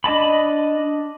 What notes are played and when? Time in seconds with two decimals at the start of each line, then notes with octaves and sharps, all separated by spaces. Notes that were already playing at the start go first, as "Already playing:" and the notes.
0.04 D4 D#5 A5 B5